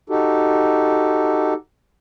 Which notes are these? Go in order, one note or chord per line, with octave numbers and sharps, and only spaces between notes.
D#4 F#4 G4 A4